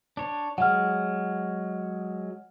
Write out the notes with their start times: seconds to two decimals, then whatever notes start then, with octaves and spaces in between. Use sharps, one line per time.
0.17 D4 C#5
0.58 F#3 G#3 F#5 F6